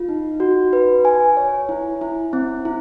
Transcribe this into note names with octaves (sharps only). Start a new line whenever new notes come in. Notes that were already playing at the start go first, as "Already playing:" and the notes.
Already playing: F4
D#4
F#4
B4
G#5
C#5
E4
E4
C4
E4